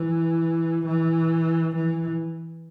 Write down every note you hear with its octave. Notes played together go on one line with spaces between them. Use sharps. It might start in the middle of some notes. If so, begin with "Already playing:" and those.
Already playing: E3
E3
E3